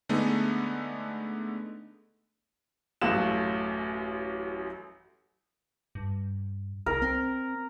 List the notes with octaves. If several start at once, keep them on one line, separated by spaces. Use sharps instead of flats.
D3 G#3 A3 B3 D#4
A1 F#2 A3 F5 F#6 E7
G2
C2 A#4
C4